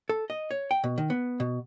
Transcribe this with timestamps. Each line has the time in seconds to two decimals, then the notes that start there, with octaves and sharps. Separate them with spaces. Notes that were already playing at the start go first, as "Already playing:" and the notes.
0.09 A4
0.30 D#5
0.51 C#5
0.71 G5
0.84 B2
0.98 D#3
1.10 B3
1.40 B2